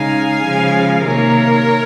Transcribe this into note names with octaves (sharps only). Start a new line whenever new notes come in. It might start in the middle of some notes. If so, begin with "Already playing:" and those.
Already playing: C#3 G#3 D#4 F5 G#5
C#3 F3 G#3
C3 D#3 A#3 A#4 C#5